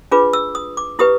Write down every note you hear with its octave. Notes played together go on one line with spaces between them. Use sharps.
D4 F4 G#4 B4 D6
E6
D#6
D6
E4 G4 B4 D#6